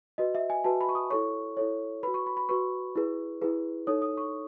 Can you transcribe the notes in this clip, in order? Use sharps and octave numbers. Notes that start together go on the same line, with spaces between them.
F#4 B4 D#5
E5
G#5
F#4 B4 A5
B5
C#6
D#6
E4 A4 C#5 C#6
E4 A4 C#5
F#4 B4 B5
C#6
B5
B5
F#4 B4 C#6
E4 G#4 B4
E4 G#4 B4
D#4 A4 C#5 D#6
D#6
C#6